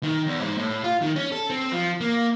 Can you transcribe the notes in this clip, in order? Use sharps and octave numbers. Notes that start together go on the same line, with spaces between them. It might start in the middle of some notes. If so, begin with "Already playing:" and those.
D#3
E2
G#2
A2
F4
D#3
C#4
A4
C4
F3
A#3